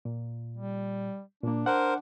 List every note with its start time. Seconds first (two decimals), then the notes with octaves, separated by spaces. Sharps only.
0.05 A#2
0.57 G3
1.44 A#2 A#3 D4
1.66 A#4 C5 F#5